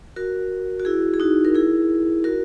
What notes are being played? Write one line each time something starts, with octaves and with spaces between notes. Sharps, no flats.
F#4 A#4
F#4
E4 G#4
G#4
D#4 F#4
A#4
E4 G#4
F#4 A#4